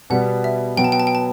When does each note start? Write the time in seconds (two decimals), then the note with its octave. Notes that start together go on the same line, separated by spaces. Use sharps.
0.10 B2 G3 B3 F#5
0.44 E5
0.77 B2 F#3 B3 G5
0.84 A5
0.92 G5
1.00 A5
1.07 G5
1.15 A5